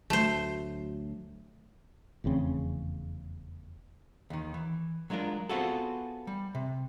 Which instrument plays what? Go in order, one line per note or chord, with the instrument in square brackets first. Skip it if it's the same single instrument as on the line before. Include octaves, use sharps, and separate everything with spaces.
[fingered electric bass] D2 F#3 [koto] A3 C5
[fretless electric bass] F1 E2 C#3 C4
[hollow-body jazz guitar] D#2 D#3
E3
F#3 G#3 D4 F4 A#4
B3 C4 F4 F#4 G#4 A4
G3
C3